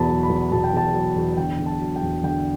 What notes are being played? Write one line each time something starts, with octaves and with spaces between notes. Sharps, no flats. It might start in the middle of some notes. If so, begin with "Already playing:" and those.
Already playing: E2 B2 A5 B5
F#3
B5
E2
B2 A5
G5
E2 A5
F#3
E2
D3 G5
E2
A5
F#3
G5
E2
D3 G5